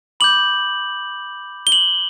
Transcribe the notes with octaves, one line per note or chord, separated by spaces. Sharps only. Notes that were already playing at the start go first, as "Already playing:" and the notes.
B5 D6 G6 F#7
G7
F#7